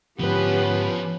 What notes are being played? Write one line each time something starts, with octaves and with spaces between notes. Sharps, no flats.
G#2 D3 F3 B3 C#4 G4 B4